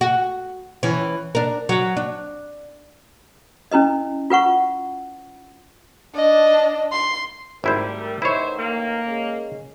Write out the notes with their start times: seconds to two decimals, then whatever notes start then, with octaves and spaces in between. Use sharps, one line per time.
0.01 F#4
0.83 E3 C#4
1.35 D4 A#4
1.69 F#3
1.97 D4
3.71 C#4 E4 B4 D#5
4.30 F4 B4 F#5 C#6
6.15 D4 D#5
6.92 C6
7.64 G#1 G3 A3 E4 A#4 C5
8.22 A1 D#3 E4 C5 C#5 E5
8.59 A#3
9.07 G#3 C#4